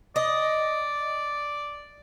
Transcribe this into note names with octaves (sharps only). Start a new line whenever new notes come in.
D5 D#5